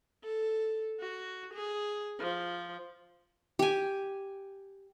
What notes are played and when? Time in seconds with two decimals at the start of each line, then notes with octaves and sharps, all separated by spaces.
0.24 A4
1.00 F#4
1.54 G#4
2.20 F3
3.59 G4 G#5